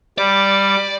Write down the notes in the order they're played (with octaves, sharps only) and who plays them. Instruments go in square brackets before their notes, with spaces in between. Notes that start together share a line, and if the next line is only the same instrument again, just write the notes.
[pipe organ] G3 [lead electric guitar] D5